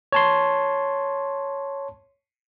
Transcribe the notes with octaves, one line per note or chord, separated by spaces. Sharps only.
C#5 A5 C6